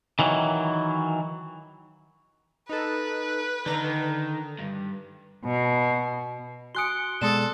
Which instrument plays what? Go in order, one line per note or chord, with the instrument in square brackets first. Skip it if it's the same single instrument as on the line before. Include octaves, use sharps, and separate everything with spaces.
[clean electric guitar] D#3 E3 F#3
[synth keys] D#4 A4 [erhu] B4
[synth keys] D3 A#5 [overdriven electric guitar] D#3
[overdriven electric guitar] G2
[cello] B2
[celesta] F#4 G#5 D7 [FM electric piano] C6 C#7 [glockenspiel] D#6 F#6 G7
[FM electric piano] B2 G#3 A5 [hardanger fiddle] A4 [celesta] D5 C6 D#6 [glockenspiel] E7